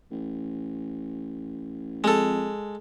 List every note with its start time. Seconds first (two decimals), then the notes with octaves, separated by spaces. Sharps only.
0.11 A1
2.04 F2 G#3 A4